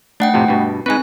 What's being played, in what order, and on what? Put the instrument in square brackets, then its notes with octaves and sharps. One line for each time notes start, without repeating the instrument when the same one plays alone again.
[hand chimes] A3 F#5 G5 [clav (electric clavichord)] D4
[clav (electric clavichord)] F2 A2 C3
G2 B2
[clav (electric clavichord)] G#3 D#4 B4 [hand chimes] C4 G#5